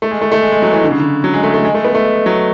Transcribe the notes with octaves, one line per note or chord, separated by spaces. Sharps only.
A3
G#3
A3
A3
G#3
G#3
F#3
E3
D3
C#3
D3
F#3
G#3
A3
A3
G#3
A3
B3
A3
F#3